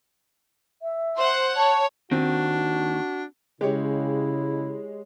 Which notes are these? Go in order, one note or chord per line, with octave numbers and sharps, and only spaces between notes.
E5
C5 F#5
C#5 A5
D#2 D#3 C4 D4 F#4
C#3 G#3 E4 G4 C#5